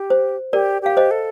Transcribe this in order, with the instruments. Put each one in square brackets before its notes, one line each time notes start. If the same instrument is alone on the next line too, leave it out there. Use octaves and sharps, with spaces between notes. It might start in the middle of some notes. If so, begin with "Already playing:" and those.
Already playing: [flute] G4
[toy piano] C5
[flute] G4 [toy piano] A#4 D5
[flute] G4 [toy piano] F5
[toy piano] C5 D#5
[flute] A4